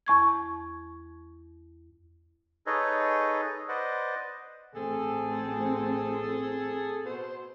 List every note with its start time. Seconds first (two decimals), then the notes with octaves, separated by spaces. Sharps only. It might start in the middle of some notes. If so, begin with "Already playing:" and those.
0.06 E2 C#6 G#6
2.66 D#4 G#4 A4 B4 C#5 D#5
3.69 B4 C5 D5 D#5 F#5
4.75 A1 C4 G#4 A4
7.04 B2 C5